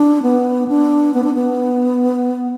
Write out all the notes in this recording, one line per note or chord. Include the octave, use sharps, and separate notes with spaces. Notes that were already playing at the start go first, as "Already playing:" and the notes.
Already playing: D4
B3
D4
B3
D4
B3